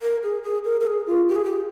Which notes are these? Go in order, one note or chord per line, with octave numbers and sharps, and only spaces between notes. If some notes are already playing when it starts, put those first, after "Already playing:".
A#4
G#4
G#4
A#4
A#4
G#4
F4
G4
G#4
G4